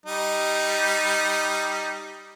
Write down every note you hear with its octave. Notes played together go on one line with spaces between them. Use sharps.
G3 D#4